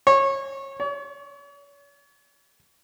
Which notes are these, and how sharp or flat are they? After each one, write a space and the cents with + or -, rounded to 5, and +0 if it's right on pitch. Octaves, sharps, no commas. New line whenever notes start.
C#5 -25
C#5 +40